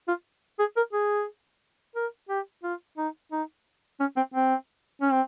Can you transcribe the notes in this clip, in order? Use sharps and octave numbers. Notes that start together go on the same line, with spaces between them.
F4
G#4
A#4
G#4
A#4
G4
F4
D#4
D#4
C#4
C4
C4
C#4
C4